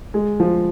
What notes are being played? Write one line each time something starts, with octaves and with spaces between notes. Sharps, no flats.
G#3
F3